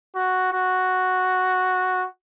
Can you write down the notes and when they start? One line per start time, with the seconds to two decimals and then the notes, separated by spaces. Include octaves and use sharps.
0.16 F#4
0.53 F#4